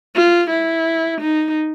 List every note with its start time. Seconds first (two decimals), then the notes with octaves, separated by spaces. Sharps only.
0.15 F4
0.50 E4
1.21 D#4